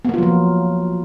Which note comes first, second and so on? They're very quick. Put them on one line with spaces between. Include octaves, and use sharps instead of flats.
B3 A#3 F4 F#3 F3